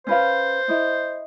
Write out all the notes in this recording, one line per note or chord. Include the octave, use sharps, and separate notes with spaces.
C#4 B4 C5 F5
E4 D#5